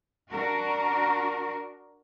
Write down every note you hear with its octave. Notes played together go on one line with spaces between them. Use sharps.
D4 F#4 A#4